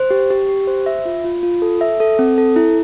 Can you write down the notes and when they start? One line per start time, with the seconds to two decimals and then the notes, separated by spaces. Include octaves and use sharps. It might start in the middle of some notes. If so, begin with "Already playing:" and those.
Already playing: C5
0.11 G4
0.30 G4
0.49 G4
0.67 C5
0.86 E5
1.05 F4
1.24 F4
1.43 F4
1.62 A4
1.81 E5
2.00 A4
2.19 C4
2.38 A4
2.56 E4